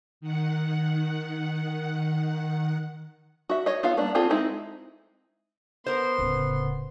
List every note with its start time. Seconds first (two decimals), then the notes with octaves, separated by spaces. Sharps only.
0.21 D#3 F#5
3.49 F#4 E5
3.66 C#5 D#5
3.83 B3 F4 A4 F5
3.97 G3 A#3 B3 D4
4.15 C4 F4 G#4 A4
4.30 G#3 C4 D#4 E4
5.86 B3 A#4 C5 C6
6.18 D1 C#3